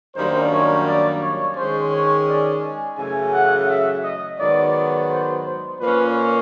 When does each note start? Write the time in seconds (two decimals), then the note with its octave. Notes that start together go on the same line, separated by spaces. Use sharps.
0.15 F#2 D#3 G3 A#3 D4 C5
0.51 C#5
0.86 D5
1.21 C#5
1.56 D#3 G#3 C#4 C5
1.92 C#5
2.27 D5
2.62 G#5
2.97 F#2 C#3 E3 A3 G#5
3.33 F#5
3.68 E5
4.03 D#5
4.39 G#2 D#3 F#3 B3 D5
5.09 C5
5.45 C5
5.79 A#2 F3 A#3 C#4 B4